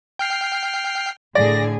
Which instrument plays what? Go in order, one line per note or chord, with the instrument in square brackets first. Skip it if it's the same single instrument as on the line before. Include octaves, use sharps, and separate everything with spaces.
[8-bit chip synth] G5 F6 C7
[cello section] A2 D3 G#4 [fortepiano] D5 [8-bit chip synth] A#6